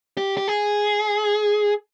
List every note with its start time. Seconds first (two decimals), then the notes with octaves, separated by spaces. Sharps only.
0.18 G4
0.37 G4
0.48 G#4